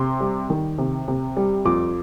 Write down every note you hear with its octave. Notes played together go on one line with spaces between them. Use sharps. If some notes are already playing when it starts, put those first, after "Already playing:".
Already playing: C3 C6
G3
D#3
C3
C3
G3
F2 D6